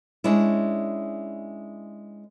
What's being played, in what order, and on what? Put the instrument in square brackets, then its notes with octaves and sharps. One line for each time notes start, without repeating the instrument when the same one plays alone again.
[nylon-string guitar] G#3 C#4 D4 E4